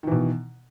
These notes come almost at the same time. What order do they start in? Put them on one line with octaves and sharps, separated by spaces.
D#3 E3 B2